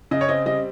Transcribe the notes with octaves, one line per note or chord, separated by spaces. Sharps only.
C#3 D#5
C#5
C4 D#5
G3 D#5